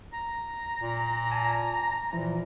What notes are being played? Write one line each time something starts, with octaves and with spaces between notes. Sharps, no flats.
A#5
A#2
G#5 A5
A#2 E3 F3 E4